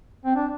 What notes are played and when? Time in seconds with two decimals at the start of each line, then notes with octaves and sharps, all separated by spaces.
0.25 C4
0.36 D4